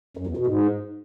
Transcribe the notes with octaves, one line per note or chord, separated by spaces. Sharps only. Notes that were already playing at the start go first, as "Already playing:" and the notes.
F#2
E2
B2
G#2